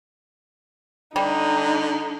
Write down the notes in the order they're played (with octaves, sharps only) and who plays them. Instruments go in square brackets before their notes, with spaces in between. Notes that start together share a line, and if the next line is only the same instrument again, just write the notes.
[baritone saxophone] D3 [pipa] G3 [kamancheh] D#4